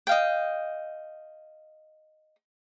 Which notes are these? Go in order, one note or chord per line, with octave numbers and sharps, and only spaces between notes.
D#5 F5 G5